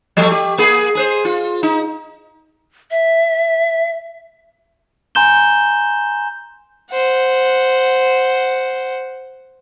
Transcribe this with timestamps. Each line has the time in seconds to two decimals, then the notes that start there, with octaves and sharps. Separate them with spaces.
0.17 F3 G3 A3
0.32 G4
0.58 A#3 G#4
0.95 G#4 B4 C5
1.25 F4
1.63 D#4
2.91 E5
5.15 G#5 A#5 C6 G6 E7 G7
6.91 C5 F#5